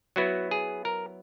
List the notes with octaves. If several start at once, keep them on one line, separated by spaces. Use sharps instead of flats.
F#3 B3 E4 F#4
G#4
A#4